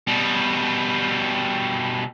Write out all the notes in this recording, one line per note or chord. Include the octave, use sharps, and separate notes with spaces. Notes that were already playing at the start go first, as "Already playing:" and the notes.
B2 G3